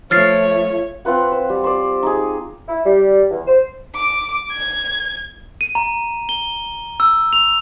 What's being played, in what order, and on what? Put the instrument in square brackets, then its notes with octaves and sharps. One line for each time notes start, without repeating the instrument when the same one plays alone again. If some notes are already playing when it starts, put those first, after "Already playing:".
[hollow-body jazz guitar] F3 [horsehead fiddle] A3 F4 [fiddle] C#5 [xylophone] F6 A6 C7
[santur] C4 F4 B4 F#5
C5
G3
C5 D5
D#4 G#4
[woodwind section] E4
G3
E2
C5
[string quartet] D6
G#6
[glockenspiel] D#7
A#5
G7
E6
F7